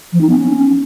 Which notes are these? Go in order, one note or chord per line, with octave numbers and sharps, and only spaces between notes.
F3
D#4
B3
C#4